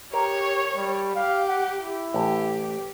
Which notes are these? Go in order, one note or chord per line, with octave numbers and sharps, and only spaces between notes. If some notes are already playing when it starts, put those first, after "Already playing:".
G4 A#4 C#5
G3
G4 F5
F#5
E4
A1 G4